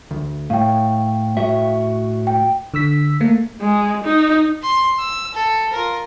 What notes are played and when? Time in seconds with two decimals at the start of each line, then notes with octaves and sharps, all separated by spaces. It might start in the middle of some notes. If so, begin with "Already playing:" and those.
0.11 D2
0.50 A2 F5 G5
1.37 A2 F#4 E5
2.27 G5
2.74 D3 E6 B6
3.21 A3 A#3
3.61 G#3
4.04 D#4
4.63 C6
4.99 E6
5.34 A4
5.73 F4 A#4